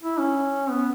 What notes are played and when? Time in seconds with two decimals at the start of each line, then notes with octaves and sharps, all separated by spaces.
0.03 E4
0.19 C#4
0.70 B3